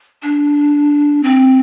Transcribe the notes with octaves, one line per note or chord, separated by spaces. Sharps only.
D4
C4